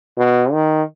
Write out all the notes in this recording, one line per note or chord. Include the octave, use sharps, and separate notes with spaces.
B2
D#3